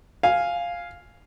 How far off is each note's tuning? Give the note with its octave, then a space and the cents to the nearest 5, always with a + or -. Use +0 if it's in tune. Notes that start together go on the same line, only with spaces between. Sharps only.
F5 +0 G#5 +0